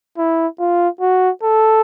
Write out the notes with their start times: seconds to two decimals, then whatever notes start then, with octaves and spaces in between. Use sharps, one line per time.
0.18 E4
0.59 F4
1.01 F#4
1.43 A4